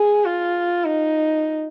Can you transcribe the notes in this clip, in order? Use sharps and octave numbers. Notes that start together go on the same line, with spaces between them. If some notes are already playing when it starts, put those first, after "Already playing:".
Already playing: G#4
F4
D#4